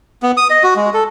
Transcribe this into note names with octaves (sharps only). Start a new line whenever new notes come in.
B3
D#6
D#5
F#4
G#3
A4